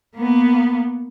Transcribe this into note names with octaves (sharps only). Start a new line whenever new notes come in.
A#3 B3